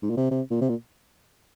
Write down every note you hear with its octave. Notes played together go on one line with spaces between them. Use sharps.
G#2
A#2
C3
C3
A#2
C3
A#2